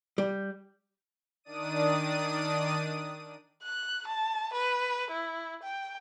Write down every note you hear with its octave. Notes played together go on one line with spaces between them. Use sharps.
G3
D#3 D4 D5 D#6 D#7
F#6
A5
B4
E4
G5